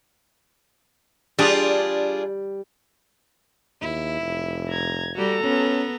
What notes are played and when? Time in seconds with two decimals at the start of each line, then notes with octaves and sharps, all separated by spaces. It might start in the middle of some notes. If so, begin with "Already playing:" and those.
1.39 G3 D4 F4 G#4
3.82 D#2 E4
4.21 F1
4.69 A#5 G#6
5.15 G3 F#4 A4 A#5
5.44 B3 C#4